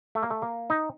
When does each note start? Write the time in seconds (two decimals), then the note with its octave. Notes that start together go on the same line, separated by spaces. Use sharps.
0.15 A3
0.23 A#3
0.31 A3
0.42 A#3
0.70 D#4